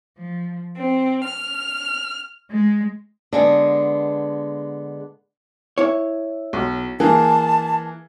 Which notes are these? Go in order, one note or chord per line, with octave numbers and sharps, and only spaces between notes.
F3
C4
F6
G#3
D3 G#3 B3
E4 C#5
B1
E3 A#3 G#4 A5